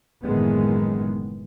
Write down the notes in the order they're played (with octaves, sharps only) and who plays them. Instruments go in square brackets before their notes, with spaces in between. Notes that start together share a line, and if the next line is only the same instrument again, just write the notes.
[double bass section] F#1 A2 D#3 E3 G#3 B3